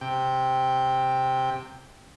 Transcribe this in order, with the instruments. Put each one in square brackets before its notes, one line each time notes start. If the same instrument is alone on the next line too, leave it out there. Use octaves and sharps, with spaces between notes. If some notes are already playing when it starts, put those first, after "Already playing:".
[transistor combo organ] C3 G5